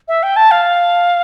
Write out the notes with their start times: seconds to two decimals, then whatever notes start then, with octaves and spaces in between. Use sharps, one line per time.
0.08 E5
0.23 G5
0.36 A5
0.51 F5